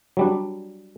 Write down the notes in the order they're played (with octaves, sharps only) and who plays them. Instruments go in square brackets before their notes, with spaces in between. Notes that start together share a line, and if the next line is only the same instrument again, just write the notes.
[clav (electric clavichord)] F#3 G3 D4